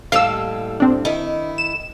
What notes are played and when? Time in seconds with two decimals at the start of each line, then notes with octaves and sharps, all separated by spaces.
0.12 D#2 A2 G3 F5 E6
0.80 C4 D4
1.05 D#3 E4
1.58 E7